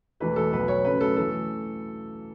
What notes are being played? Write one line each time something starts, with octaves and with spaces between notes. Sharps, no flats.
E1 E2 E3 A3 B4
A4
B1 B2 B3 B4
C#5
F#2 C#3 A3 B4
A4
E3 A3 A4